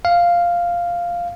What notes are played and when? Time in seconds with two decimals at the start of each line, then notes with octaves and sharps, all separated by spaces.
0.05 F5